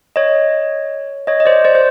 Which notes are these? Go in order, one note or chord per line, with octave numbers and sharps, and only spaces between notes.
C#5 D#5
C#5 D#5
D#5
C5 D5
C5 D5
C5